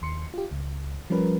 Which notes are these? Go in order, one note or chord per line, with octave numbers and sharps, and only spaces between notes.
D#2 C6 C#7
F4 G4
C#2
F3 G3 C#4 A#4 B4